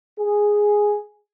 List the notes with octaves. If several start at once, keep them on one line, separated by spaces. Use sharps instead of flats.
G#4